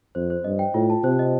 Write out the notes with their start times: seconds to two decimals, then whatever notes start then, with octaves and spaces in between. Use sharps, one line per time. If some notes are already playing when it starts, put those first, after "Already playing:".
0.15 F2 C5
0.30 C5
0.44 G2 D#5
0.59 G5
0.74 A2 F4
0.90 A5
1.03 C3 C5
1.19 D#5